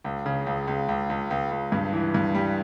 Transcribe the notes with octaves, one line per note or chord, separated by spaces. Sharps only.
C#2
C#3
C#2
C#2
C#2
C#2
C#2
C#2
G2
E3
G2
G3